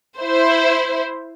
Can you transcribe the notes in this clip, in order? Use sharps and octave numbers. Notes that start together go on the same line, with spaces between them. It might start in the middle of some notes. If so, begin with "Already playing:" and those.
E4 C5